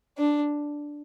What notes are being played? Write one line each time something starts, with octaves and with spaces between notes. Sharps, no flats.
D4